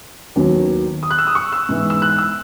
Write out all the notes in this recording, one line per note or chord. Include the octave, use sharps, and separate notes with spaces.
D#2 D#3 F#3 B3
D#6
F#6
E6
D#6
C#6
E6
G#2 E3 B3
E6
F#6
E6